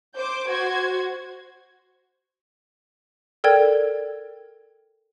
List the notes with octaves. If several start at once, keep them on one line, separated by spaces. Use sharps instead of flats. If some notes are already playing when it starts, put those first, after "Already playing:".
C5 D6 G6
F#4 C5 G#6
A4 A#4 D5 G5 G#6